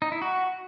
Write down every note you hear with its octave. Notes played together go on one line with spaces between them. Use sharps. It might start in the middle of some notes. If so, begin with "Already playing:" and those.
D#4
E4
F#4